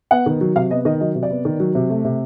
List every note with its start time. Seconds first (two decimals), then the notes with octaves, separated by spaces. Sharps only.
0.11 B3 F#5
0.26 D#3
0.41 F#3
0.55 C3 F5
0.71 B3 D#5
0.85 D#3 D#5
1.00 F#3 D#5
1.15 C3
1.23 D5
1.31 B3
1.45 D#3
1.60 F#3
1.75 C3
1.90 A3
2.05 C3